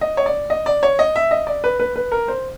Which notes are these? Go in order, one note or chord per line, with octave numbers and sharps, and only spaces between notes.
D#5
C#5
D5
D#5
D5
C#5
D#5
E5
D#5
D5
B4
B4
B4
A#4
C5